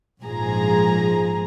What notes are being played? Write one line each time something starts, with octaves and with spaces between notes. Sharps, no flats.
A#1 G#2 F3 G#4 A#5